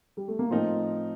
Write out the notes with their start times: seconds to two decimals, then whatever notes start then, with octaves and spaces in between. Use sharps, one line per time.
0.17 G3
0.28 A3
0.39 A#3
0.50 A2 F3 A3 C4 D#4 A#4